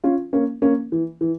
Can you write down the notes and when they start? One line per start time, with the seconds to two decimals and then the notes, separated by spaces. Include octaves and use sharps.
0.04 C#4 F4
0.33 A#3 C#4
0.62 A#3 C#4
0.92 E3
1.21 E3